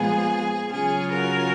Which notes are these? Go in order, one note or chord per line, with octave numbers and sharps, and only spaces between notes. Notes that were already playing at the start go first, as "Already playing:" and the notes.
Already playing: A#2 F3 G#3 B3 F4 G#4
C#3 F#3 C#4 F4 G#4
F#4 A#4